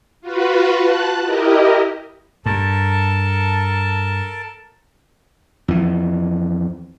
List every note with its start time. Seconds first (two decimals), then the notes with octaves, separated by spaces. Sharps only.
0.21 F4 F#4 B4
0.81 A5 F#6
1.25 E4 G4 A#4 D#5
2.46 G2 A4 A#4 A5
5.68 F2 E3